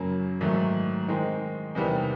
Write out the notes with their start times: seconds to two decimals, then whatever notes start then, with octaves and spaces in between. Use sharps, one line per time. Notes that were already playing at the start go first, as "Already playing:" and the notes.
Already playing: F#2 C#3 F#3 A#3
0.41 G#2 D#3 F#3 A3
1.08 D#3 G#3 C4 D#4
1.75 E2 C3 D#3 G3 B3